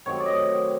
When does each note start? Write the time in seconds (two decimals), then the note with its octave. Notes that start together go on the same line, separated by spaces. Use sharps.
0.06 C3 D#3 F#3 A3 C#5
0.20 D5
0.26 D#5